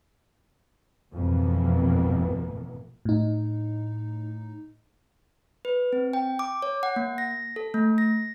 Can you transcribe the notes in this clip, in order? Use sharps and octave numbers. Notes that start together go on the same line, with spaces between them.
G#1 F2 B2 E3 A#3 B3
A2 D#4
B4
C4
G5
D6
C#5
F#5
A#3
A#6
A4
A3
A#6